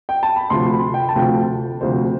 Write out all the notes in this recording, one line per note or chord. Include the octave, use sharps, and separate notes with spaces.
G5
A5
B5
D2 C3 F3 C6
B5
G5
A5
D2 C3 F3 G5
D2 C3 F3 C5